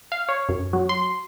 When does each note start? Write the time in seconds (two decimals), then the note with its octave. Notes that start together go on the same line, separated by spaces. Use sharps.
0.12 F5
0.29 C#5
0.49 F#2
0.73 F#3
0.89 C6